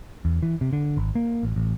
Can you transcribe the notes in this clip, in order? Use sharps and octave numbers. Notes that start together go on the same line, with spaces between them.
E2
E3
C3
D3
G#1
A#3
A1
A1